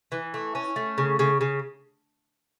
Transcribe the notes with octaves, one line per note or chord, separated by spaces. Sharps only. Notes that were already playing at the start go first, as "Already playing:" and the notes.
E3
A3
C#4
A3
C#3
C#3
C#3